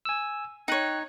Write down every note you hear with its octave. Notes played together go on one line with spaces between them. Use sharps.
G#5 E6
D#4 C#5 G5 F#6